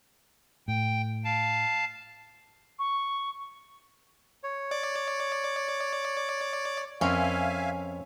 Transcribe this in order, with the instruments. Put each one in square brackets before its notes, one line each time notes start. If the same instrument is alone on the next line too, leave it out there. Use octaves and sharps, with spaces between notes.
[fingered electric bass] A2 [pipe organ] G5
[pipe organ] F5 A5
[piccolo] C#6
[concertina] C#5
[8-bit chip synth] D5
[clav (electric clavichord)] F2 C4 A#4 [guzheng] C#4 [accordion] E5 F5 G#5